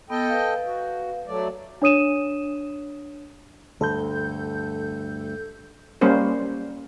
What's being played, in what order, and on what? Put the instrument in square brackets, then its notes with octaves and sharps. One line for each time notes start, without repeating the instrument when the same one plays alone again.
[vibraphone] B3 [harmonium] A4 D#5 G5
[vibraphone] B4 F5
[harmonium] F#4
F#3 A3 D5
[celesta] D4 C#5 D#6 D#7 E7
[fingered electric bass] D2 G2 [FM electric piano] A4 G6
[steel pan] G3 A#3 C#4 A#4 C5